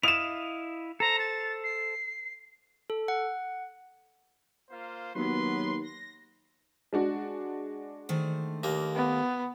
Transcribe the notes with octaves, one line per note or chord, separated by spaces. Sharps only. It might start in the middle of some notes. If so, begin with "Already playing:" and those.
E4 D#5 F5 E7 F7
A4 C5 A#5
A6
C7
A4
F#5
A#3 F4 C5
D#2 F#3 B3 B4 C6
A#6
G#3 D4 F#4
D#3 A3 C5
D#2 A#3
B3